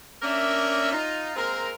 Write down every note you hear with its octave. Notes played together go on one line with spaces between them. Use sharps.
A#3 C#4 D4 A#4 E5
D#4 F4
G#3 A#3 C4 A#4